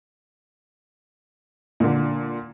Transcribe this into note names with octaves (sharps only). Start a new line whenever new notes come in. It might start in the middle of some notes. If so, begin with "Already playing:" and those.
A#2 D3